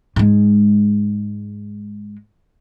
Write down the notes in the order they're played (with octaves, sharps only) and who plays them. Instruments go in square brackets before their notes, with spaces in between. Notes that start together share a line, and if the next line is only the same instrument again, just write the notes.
[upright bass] G#2 G#3